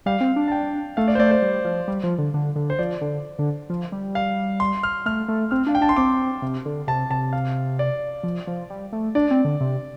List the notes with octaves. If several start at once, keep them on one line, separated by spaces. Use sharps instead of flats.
G3 F5
C4
D4
A5
G5
A3 F5
D5
C5
A3 D5
C5
G3
F3
G3
F3
D3
D3
D3
C5
F3 D5
D3
D3
F3
G3
F5
C6
F6
A3 F6
A3
C4 F6
D4 F5
G5
D4 A5
C6
C4 D6
C3
D3
C3 A5
C3 A5
F5
D5
F3
F3
G3
A3
D4 D5
C4
D3
C3